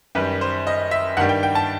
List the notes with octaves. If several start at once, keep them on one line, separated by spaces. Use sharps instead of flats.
F#2 D#3 G3 B4
C5
D#5
E5
G2 D#3 G3 F#5
G5
G5
A5